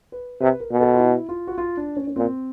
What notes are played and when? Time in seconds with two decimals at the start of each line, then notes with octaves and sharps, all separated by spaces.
0.12 B4
0.41 C3 B4
0.60 A#4
0.71 B2
0.80 A4
0.94 F4
0.99 E4
1.29 F4
1.47 F#4
1.58 F4
1.77 D4
1.97 C#4
2.08 C#4
2.16 A#2 C4